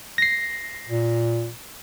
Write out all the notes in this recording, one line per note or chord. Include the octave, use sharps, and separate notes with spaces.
A#6 C7
A#2